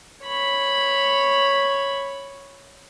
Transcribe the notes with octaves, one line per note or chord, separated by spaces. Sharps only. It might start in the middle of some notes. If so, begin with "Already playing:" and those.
C#5 B5